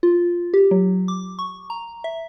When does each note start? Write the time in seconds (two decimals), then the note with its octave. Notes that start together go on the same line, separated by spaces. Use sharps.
0.03 F4
0.54 G4
0.71 F#3
1.08 D6
1.39 C#6
1.70 A#5
2.04 E5